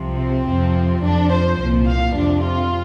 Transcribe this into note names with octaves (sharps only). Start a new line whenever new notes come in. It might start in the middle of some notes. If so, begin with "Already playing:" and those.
Already playing: C2 C3 F3
C4
F2 C3 F3
F2 F3 D4
C5
C2 A#2 F3
F5
F2 C3 F3 D4
F4